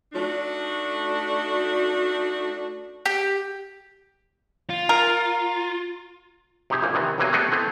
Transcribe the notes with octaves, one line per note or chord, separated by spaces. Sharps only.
A3 D4 D#4 F#4
G4
F4
A#4
C3 D#4 G4 G#4
A#1 A2 A#3 G5 G#5
C3 D#3 E3
E2 C3 E3 F#3 A#3 G#5
A3 B3 G4 G#4 D#5 F#5
A3 B3 C4 E4 A4